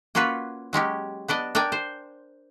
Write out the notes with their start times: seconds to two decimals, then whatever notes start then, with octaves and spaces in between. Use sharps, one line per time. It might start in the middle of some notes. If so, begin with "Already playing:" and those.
0.15 A#3 C#4 F4 F#4 B4
0.73 F#3 G#3 C#4 G4
1.28 B3 D4 D5 D#5
1.55 D4 A#4 D5 G5 G#5
1.72 C5